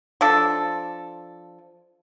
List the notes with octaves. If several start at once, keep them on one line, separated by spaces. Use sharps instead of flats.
F3 D4 A4